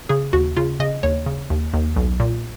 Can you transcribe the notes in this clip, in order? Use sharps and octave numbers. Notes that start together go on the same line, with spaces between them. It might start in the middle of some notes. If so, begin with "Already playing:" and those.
C#3 G#4
D#2 F#4
C#3 F4
C#3 D#5
D#2 C#5
C#3
D#2
D#2
B1
A#2